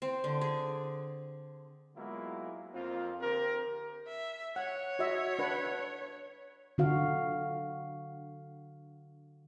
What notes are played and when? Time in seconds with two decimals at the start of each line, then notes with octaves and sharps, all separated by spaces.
0.02 C4
0.24 D3
0.41 G#4
1.96 F#3 G#3 A#3 B3 E4 F4
2.74 F2 A#3 C4 F4
3.22 D3 C4 G4 A#4
4.07 E5
4.56 C#5 F#5
4.99 F#4 D#5 E5
5.39 D4 B4 F#5
6.78 D3 F#4 F5